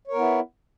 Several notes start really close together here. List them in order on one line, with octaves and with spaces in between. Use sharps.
C#5 A#4 B3 E4